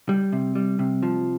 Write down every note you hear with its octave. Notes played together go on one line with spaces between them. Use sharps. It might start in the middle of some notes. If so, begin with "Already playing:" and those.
G3
C3
G3
C3
F3